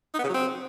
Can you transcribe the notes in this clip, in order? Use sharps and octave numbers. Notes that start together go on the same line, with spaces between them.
D#4
B3
C#3
F#3
C4